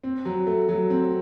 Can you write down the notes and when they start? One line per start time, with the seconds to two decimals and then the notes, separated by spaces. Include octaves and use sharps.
0.04 C4
0.25 F#3
0.47 A3
0.69 F#3
0.90 C4